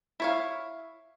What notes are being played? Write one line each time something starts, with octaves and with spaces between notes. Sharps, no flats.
E4 C#5 F5